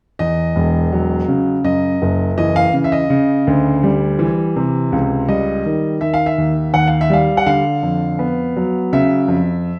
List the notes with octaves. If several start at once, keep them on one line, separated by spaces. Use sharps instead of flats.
E2 D#5
E1
F#3
C#3
F#2 D#5
F#1
E3 D#5
F5
C#3
E5
D#5
C#3
D2
G3
E3
C3
C#2
G3 D#5
D#3
D#3 E5
F5
E5
D#2
D#2 F#5
F5
E5
G3 F5
F#5
D3 F5
F2
B3
F#3
C#3 E5
F2